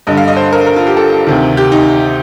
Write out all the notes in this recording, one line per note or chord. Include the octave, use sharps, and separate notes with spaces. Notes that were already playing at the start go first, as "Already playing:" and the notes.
G2 D3 D#5
F5
D#5
C5
A#4
A#4
F4
G4
A4
D2 C3 D#3
G4
D#4